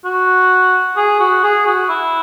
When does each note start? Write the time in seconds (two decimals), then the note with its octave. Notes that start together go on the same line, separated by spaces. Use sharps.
0.05 F#4
0.97 G#4
1.20 F#4
1.43 G#4
1.67 F#4
1.89 E4